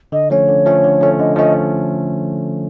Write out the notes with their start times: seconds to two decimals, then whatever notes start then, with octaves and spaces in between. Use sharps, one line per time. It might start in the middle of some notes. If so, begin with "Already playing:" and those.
0.12 D3 D#5
0.30 F3 A3 C#4 C#5
0.49 D3
0.66 F3 A3 C#4
0.84 D3
1.01 F3 A3 C#4
1.19 D3 D#5
1.36 F3 A3 C#4 D#5